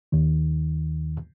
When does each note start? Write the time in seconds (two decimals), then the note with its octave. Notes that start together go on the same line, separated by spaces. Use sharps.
0.12 D#2 D#3